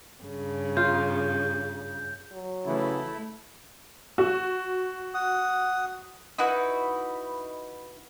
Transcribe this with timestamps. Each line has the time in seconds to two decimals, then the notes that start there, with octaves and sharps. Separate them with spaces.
0.22 G2 C#3
0.77 F4 G6
2.32 F#3
2.66 C#3 E3 A3 E4
4.18 F#4
5.14 F#5 D#6
6.38 D#4 E4 F#4 B4